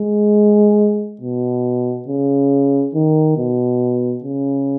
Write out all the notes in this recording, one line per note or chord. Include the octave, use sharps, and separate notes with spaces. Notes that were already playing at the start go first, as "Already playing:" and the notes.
Already playing: G#3
B2
C#3
D#3
B2
C#3